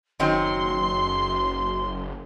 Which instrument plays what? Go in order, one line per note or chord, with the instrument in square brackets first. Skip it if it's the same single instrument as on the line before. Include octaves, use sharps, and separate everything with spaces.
[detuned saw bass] F#1 [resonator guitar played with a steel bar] D#3 F#3 C4 [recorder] C6